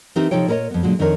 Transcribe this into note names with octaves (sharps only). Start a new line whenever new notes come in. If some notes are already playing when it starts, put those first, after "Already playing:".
E3 C4 D#4 G4 A#4 E5
C3 F3 D#4 A4 C#5 G5
A#2 G#4 A#4 B4 C#5 D#5
F2 B3
A#2 D3 F#3 G#3
F2 D#3 C4 D4 A#4 C#5